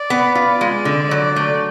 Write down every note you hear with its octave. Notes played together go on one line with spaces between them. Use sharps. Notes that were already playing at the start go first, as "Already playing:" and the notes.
Already playing: D5
B3
F4 D5
G#3
D3
F#3
A3